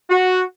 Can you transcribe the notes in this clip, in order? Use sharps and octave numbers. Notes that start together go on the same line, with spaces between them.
F#4